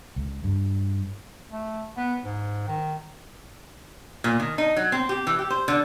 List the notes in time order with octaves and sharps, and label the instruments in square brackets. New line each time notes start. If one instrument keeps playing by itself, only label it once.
[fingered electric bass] C#2
G2
[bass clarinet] A3
B3
G#2
D#3
[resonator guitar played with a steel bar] A#2
D#3
D#4
F#3
C4
G4
E3
G4
C5
D3